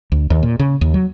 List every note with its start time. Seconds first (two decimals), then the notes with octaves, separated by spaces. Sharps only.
0.12 D2
0.30 D#2
0.43 A#2
0.59 C#3
0.81 D#2
0.94 F#3